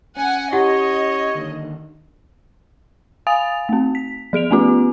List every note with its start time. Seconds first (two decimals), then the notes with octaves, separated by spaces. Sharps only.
0.17 C#4 F#5 G#5
0.53 E4 G4 C#5 D#5 F#5
1.35 D3 D#3 A#3
3.27 F5 G#5 D#6 A6 F7
3.69 A3 C4
3.95 B6
4.33 F3 G#4 D7 F7
4.51 A3 B3 C#4 F4